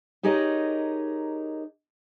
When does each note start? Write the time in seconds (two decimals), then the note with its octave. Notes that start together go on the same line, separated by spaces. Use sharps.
0.23 D#4 G4 G#4 A#4 C#5 D#5